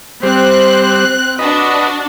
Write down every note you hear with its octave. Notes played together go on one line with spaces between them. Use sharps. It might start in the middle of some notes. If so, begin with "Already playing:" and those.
G3 C4 C5 F#6
D4 F#4 B4 D#5